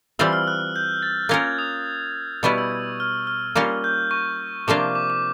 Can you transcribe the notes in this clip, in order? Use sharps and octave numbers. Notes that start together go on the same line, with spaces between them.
E3 G3 C4 F4 E6
F6
F#6
G6
A6
A#3 C#4 F4 A#4 G#6
D#6
B2 G3 B3 E4 C#6
E6
F6
F6
G3 A#3 C#4 F4
G6
C#6
C3 F3 A#3 D4 F4 D6
D6
D6